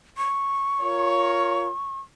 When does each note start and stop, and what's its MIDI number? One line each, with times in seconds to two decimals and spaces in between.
0.17 2.00 85
0.81 1.70 65
0.81 1.70 70
0.81 1.70 73